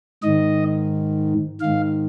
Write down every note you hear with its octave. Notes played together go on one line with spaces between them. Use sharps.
G#2 D#3 D#5
D#3 F5
G#2